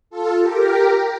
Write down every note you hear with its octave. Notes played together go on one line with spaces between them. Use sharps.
F4 A4
G4 A#4